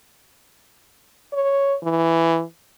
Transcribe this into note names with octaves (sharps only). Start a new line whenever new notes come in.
C#5
E3